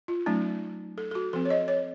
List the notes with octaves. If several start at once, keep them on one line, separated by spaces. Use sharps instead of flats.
F4
F#3 A3 C#4 D#4
A4
A4
F#4
F3 C4 A4
C#5
D#5
C#5